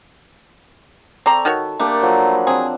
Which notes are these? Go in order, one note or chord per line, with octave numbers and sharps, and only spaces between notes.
C4 A4 D5 A#5 B5 C#6
D#3 F#4 C#5
A3 A#3 D4 G4
F3 F#3
B5
C4 G#4